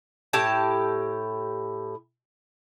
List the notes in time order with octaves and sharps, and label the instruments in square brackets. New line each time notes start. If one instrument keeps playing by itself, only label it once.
[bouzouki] A2 E4 G4 A5